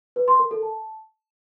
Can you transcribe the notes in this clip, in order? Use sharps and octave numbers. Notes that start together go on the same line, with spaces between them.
B4
C6
A#4
A4
A5